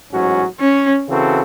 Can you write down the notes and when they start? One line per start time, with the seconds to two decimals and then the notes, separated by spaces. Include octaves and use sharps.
0.12 A1 G#2 F#3 C#4 F#4
0.60 C#4
1.08 C#3 E3 C4 F#4 A4